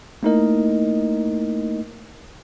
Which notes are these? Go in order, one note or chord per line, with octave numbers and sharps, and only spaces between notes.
A3 A#3 D#4 E4 A#4 D#5